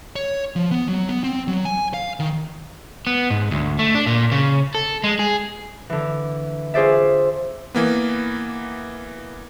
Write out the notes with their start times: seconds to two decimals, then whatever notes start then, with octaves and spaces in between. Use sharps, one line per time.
0.16 C#5
0.56 F3
0.71 B3
0.88 F#3
1.09 B3
1.24 C4
1.48 F#3
1.65 G#5
1.94 F5
2.20 D#3
3.07 B3
3.30 G#2
3.51 D2
3.79 A3
3.95 D4
4.07 A#2
4.32 C#3
4.75 A4
5.04 G#3
5.19 G#4
5.90 D3 E3
6.74 F4 G#4 C5 D5 E5
7.75 E3 A#3 B3